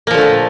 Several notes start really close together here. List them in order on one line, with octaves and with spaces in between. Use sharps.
A#3 F3 D3 A3 A#2